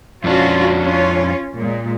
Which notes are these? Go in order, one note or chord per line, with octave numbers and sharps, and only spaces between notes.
F2 C#4 D4 F4 F#4
C#4 F4
A#2 G#3